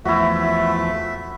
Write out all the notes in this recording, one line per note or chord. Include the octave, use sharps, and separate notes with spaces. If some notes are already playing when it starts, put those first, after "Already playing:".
E2 F3 A3 E4 F#4 E5